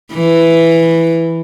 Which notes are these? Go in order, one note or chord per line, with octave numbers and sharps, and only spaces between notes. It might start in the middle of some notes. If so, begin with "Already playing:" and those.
E3